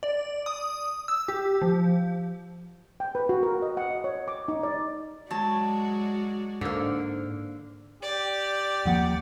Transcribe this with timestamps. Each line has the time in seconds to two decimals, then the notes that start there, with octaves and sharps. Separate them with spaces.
0.03 D5
0.46 D#6
1.08 E6
1.28 G4
1.62 F3
3.00 G5
3.15 B4
3.29 F#4
3.43 A#4
3.62 D#5
3.77 F#5
3.90 D#5
4.04 C#5
4.28 D6
4.48 D#4
4.63 D5
5.31 F#3 G#3 F#4 D5 A5
6.61 G#2 D3 A#3
8.02 G4 D5
8.85 D#1 F3 A#3 F#5